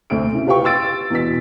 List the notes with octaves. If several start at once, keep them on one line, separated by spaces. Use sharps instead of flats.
D2 C4 D7
C#3 E4
F4 G4 B4 F5 G5 C#6
C6 E6 A6 D7
E2 B2 B6